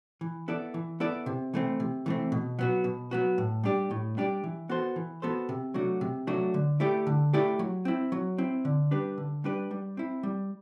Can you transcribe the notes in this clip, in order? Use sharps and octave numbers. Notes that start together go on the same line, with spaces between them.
E3
B3 E4 A4 D5
E3
B3 E4 A4 D5
C3
E3 A3 C4
C3
E3 A3 C4
B2
F#3 B3 F#4
B2
F#3 B3 F#4
A2
G3 D4 G4 D5
A2
G3 D4 G4 D5
E3
B3 F#4 A4 C5
E3
B3 F#4 A4 C5
C3
F#3 A3 D4 F#4
C3
F#3 A3 D4 F#4
D3
A3 E4 G4 D5
D3
A3 E4 G4 D5
F#3
C4 E4
F#3
C4 E4
D3
G3 D4 G4 B4
D3
G3 D4 G4 B4
G3
C4 E4
G3